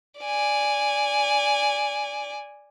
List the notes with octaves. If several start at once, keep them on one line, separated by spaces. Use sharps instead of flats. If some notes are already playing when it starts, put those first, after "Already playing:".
D5 G#5